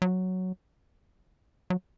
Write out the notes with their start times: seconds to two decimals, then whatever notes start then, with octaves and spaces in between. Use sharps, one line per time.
0.02 F#3
1.70 F#3